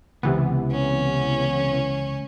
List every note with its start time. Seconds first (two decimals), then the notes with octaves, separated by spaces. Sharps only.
0.23 C#2 C3 E3 B3
0.71 C#4